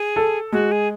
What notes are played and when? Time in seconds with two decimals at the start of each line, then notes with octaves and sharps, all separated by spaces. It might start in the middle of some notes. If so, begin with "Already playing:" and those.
Already playing: G#4
0.16 A4
0.52 G#3 F#4
0.71 G#4